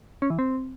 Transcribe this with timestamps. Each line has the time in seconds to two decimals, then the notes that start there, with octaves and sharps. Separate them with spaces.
0.22 C#4
0.30 E3
0.39 C4